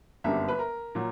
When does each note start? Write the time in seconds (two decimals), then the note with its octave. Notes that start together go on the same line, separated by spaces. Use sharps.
0.24 G1 F#2 D3 G3 A#3 E5
0.48 B4
0.59 A#4
0.95 A#2 F#3